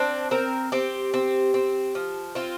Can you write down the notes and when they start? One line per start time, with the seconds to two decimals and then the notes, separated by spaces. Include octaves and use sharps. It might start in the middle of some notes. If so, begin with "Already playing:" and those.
Already playing: C4 D4
0.31 C4 A#4
0.72 C4 G4
1.14 C4
1.54 C4
1.95 F3
2.35 C4 F4